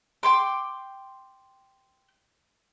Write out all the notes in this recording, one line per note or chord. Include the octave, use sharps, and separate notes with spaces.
G5 C6 D6